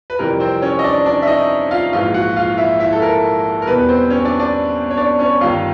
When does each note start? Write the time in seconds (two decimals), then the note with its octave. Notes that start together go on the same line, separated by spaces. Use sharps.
0.10 B4
0.19 F2 C3 E3 G3 A#4
0.40 C4 C5
0.62 C#4 C#5
0.79 D#5
0.84 D4 D5
1.06 D4 D5
1.22 E5
1.27 D#4 D#5
1.71 F4 F5
1.93 A#1 G#2 E3 F4 F5
2.14 F#4 F#5
2.36 F4 F5
2.58 E4 E5
2.80 E4 E5
2.92 A4
3.02 A#4
3.62 A#4
3.67 E2 B2 G3 B3 B4
3.89 C4 C5
4.10 C#4 C#5
4.25 D4 D5
4.39 D4 D5
4.91 C#5
4.97 D4 D5
5.19 C#4 C#5
5.41 G1 G2 D#3 F4 F5